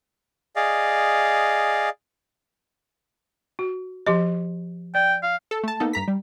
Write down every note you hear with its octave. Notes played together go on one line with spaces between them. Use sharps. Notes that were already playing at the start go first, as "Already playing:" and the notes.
G#4 D5 D#5 F5
F#4
F3 G4 D#5
D5 G5
F5
A4
A3 A5
A#3 B3 D#4 A4
G2 A#5 B6
G3